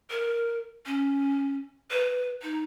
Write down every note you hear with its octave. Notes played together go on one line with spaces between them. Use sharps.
A#4
C#4
B4
D#4